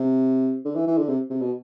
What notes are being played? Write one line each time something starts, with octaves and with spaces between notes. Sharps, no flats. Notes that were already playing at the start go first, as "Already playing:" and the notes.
Already playing: C3
D3
E3
E3
D3
C3
C3
B2